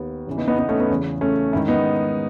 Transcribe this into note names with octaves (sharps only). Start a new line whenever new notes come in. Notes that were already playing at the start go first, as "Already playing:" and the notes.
Already playing: D#2 D#3 B3
E2 C#3 E3
B3 D#4
B3 D#4
B3 D#4
A3 C#4
B3
E2 C#3 E3
A3 C#4
G#2 D#3 C#4 E4
B3 D#4